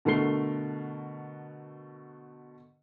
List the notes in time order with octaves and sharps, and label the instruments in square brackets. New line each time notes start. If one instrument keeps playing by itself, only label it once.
[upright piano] B2 D3 A3 A#4 C7 G7